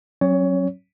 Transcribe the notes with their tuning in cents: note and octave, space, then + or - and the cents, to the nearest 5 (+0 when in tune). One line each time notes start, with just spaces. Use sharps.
F#3 +0 C#4 -35 C#5 +20